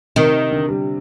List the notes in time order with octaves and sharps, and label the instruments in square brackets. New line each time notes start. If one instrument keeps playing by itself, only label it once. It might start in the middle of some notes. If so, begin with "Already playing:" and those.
[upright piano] C3 [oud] D#3
[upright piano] D3
G3